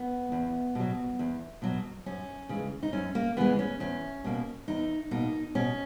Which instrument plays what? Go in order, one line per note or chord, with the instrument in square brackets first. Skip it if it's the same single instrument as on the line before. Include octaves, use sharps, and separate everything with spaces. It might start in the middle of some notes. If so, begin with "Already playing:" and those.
Already playing: [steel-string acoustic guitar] B3
E2
B2 F#3
E2
B2 F#3
F#2 C#4
C#3 E3 G#3
D#4
F#2 C#4
A#3
C#3 E3 G#3 B3
C#4
E2 C#4
B2 A#3
E2 D#4
B2 A#3 D#4
B2 C#4